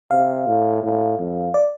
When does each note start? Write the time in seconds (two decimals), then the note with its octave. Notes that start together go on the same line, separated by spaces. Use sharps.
0.11 C3 F5
0.47 A2
0.83 A2
1.19 F2
1.54 D5